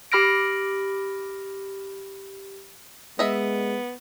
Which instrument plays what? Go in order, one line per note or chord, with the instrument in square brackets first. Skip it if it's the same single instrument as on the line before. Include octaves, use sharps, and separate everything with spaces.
[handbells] G4 B5 F6 A#6 D7
[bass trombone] G#3 [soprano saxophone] B3 [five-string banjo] D#5 E5